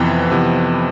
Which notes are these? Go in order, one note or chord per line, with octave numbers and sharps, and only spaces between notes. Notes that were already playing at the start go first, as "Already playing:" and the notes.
Already playing: F2 C3 E3 B3
F2 C3 E3 B3